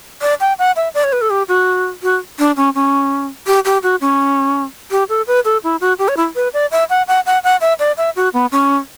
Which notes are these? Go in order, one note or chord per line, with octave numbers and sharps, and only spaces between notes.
D5
G5
F#5
E5
D5
C#5
B4
A4
G4
F#4
F#4
D4
C#4
C#4
G4
G4
F#4
C#4
G4
A4
B4
A4
E4
F#4
G4
C#5
E4
B4
D5
E5
F#5
F#5
F#5
F#5
E5
D5
E5
F#4
B3
C#4